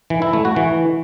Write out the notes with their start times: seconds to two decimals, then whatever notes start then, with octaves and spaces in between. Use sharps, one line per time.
0.10 E3
0.22 E4
0.33 A3
0.45 F#4
0.56 E3